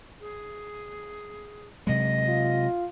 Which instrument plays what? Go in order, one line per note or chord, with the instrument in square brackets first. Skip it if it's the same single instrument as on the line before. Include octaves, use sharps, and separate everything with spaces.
[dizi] G#4
[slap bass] C3 F#3 G#3 [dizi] D#5
[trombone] F4